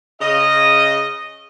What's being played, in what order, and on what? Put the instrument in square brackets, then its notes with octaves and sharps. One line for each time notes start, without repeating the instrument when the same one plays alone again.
[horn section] C#3 D#5